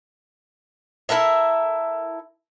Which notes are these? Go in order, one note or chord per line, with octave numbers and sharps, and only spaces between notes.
E4 A4 A#4 E5